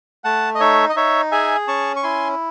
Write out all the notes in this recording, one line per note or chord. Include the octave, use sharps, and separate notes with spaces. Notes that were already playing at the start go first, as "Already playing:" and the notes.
A3 F#5 A5
D#5
D#4 C#5 E5
D#5
D#4 C#5 E5
G#4 E5 G#5
C#4 A5 C#6
C#6
E4 G#5 C6